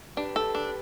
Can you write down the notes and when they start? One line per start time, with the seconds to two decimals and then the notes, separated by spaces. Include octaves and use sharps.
0.17 D4 G4 B4
0.36 A4
0.55 D4